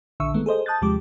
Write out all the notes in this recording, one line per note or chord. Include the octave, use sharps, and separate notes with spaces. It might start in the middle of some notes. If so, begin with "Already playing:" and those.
A#1 D3 E5 C#6 E6
D#3 G#3 A3 B3
G#4 A4 C5 D#5
A5 D#6 F#6 G6 A6
D#2 C3 F3 G#3 G4 D6